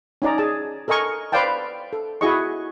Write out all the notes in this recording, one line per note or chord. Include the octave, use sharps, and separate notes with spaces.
C#4 D#4 D5 A#5
G#4 A5
A4 A#4 D#5 G#5 C#6
B4 C5 D5 F5 G5 A5
A4
E4 F#4 G#4 D#5 C#6